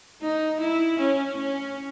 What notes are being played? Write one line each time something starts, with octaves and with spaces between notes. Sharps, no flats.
D#4
E4
C#4
C#4